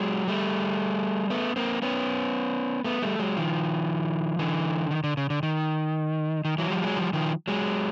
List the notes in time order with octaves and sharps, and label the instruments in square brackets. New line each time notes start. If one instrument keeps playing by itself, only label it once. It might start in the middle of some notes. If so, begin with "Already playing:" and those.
Already playing: [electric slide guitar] F#3 G#3
G3 A3
A3 B3
A#3 C4
B3 C#4
A3 B3
G3 A3
F#3 G#3
D#3 F3
D3 E3
D#3
D3
C#3
D3
D#3
D#3
E3 F#3
F3 G3
F#3 G#3
F3 G3
D#3 F3
F#3 G#3